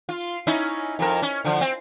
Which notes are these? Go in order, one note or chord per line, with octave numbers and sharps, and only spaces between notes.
F4
C#4 D#4 E4
F2 A#4
C#4
D3 F3
C4